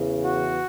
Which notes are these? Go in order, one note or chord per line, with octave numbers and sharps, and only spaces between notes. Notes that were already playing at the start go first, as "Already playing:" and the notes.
Already playing: E2 C#3 E3
F#4